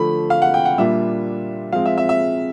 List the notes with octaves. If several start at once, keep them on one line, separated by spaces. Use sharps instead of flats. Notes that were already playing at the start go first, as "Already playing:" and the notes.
Already playing: D3 F3 A3 B5
F5
F#5
G5
F#5
A#2 G3 A#3 D4 F4 E5
F3 G#3 C4 F5
E5
E5
E5